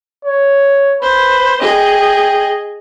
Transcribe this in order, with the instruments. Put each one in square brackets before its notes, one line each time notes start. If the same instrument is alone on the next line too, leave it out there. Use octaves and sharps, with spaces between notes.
[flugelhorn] C#5
[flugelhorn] B4 [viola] C5
[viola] G#4 D#5 [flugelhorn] G5